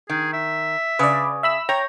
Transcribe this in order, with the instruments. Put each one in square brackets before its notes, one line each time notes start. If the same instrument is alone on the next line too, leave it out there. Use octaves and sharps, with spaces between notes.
[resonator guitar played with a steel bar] D#3 [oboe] G#4
[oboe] E5
[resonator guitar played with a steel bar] C#3 [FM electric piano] B4 D5
[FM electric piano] E5 B5 E6
[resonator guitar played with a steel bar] C#5 [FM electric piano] G5 A#5